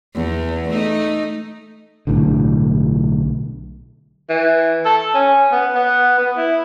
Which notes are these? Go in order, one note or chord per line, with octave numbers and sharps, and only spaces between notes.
E2
A3 D#4
B1 A2 D3
E3
A4
C#4
B3
B3
B3
E4